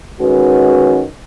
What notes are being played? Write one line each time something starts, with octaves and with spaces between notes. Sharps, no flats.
D#3 G#3 C#4 F#4 B4